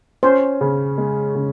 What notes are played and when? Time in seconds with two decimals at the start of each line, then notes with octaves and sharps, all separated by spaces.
0.23 C#4 C5
0.61 C#3
0.98 G#3
1.35 C#3